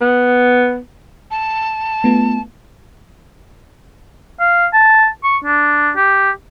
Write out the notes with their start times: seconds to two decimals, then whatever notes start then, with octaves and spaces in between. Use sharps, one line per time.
0.01 B3
1.31 A5
2.04 A3 B3 F4
4.40 F5
4.73 A5
5.24 C#6
5.44 D4
5.96 G4